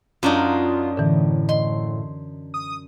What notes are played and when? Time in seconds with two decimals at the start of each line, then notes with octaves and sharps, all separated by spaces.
0.23 F#2 D4 D#4 F4
0.97 A2 D3 E3
1.49 D#5 C6
2.54 D#6